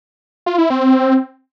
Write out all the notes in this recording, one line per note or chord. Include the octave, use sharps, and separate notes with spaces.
F4
E4
C4